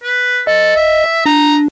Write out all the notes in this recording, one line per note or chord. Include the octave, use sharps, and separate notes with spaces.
B4
A4 D#5
E5
D4 A#5